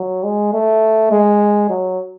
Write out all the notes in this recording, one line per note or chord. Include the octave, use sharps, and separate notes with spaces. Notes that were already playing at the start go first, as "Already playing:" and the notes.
Already playing: F#3
G#3
A3
G#3
F#3